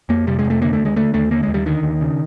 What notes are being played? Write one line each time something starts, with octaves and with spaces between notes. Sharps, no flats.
F2 A#3
C3 G3
G#3
F2
A3
D3 A#3
A3
D#2
G#3
D3 A3
D#2 A3
D3 A#3
G#3
D#2
G3
D3 D#3
D#2
C#3